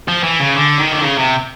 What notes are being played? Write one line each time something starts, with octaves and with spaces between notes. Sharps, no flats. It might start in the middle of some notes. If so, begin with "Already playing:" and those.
F3
E3
C#3
D3
D#3
D3
C#3
C3